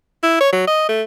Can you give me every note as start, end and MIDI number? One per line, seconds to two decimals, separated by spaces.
0.23 0.37 64
0.41 0.51 73
0.52 0.66 54
0.67 0.85 75
0.89 1.02 57